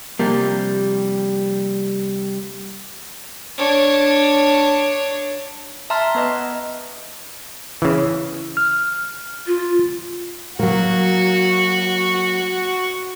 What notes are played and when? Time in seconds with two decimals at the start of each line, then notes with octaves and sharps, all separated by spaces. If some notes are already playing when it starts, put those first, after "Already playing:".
0.19 C3 F3 G3 A#3
3.58 D4 C#5
5.90 E5 A5 A#5 C6 F6
6.15 B3 B4 D#5
7.82 C#3 E3
8.57 F6
9.47 F4
10.59 F#3 A#3 F#4